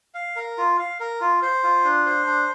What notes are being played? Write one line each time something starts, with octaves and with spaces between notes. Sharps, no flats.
F5
A#4
F4
F5
A#4
F4
C5
F4
D4
C5
D4